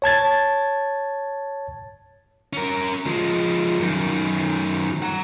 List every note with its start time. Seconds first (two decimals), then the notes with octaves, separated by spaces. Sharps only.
0.02 C#5 A5 G#6 A6
2.53 C#4 A#4
3.06 F3 G#3
3.80 F#2 D#3
5.02 F#5 A#5